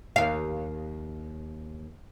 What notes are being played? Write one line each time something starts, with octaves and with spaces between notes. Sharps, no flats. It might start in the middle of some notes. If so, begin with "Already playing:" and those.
D#2 F5